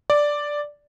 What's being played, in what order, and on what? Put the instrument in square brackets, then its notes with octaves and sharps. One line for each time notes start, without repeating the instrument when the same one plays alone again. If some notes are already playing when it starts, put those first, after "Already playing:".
[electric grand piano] D5